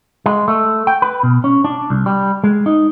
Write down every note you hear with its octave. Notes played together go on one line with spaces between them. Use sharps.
G#3
A3
G5
B4
B2
C#4
D4
C2
G3
G#3
D#4